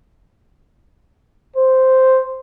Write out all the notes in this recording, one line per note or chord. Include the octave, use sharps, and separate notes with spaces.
C5